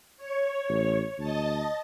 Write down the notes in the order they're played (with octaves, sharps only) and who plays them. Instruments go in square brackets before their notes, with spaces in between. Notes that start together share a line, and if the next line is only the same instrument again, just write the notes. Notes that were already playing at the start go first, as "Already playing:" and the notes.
[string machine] C#5
[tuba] A1
[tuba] D2 [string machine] D#5 A5